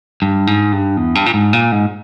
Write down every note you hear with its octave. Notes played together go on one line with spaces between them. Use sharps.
G2
G#2
G2
E2
G2
A#2
G#2
A#2
G#2